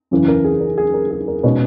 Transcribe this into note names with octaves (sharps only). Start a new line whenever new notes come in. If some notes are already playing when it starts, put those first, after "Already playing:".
F#2 C#3 E3
A#4
G#4
A#4
G#4
A#4
G#4
A#4
B2 G#3 C#4 B4